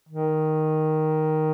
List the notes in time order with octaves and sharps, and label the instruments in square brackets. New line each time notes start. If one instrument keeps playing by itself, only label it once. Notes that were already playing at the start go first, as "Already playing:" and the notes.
[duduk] D#3